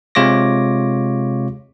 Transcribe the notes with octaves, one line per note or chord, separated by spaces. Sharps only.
C3 G#3 F4 C#5 D6 A#6